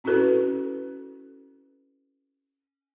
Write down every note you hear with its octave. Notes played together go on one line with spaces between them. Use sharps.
C4 C#4 E4 F#4 A4 B4